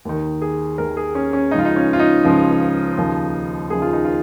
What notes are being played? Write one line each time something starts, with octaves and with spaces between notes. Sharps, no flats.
D#2 D#3
G#4
D#2 D#3 A#4
G#4
C#4
C#4
C#2 C#3 F3 D#4 F4
D#4
C#4
F4
D#4
C#2 C#3 F3
D#2 C#3 F3
D#2 C#3 F3 G#4
F4
D#4
F4